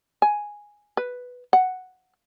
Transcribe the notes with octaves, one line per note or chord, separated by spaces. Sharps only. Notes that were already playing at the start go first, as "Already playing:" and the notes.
G#5
B4
F#5